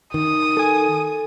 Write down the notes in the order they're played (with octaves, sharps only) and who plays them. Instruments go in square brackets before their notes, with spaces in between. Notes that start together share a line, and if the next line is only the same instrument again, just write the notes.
[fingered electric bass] D#3 [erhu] D#6
[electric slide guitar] A4 G#5